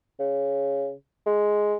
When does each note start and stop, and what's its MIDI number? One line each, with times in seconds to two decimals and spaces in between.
0.19 0.92 49
1.26 1.76 56